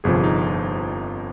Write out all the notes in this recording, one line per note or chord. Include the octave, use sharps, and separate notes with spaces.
G1 F2 C3 F3 G#4
D#4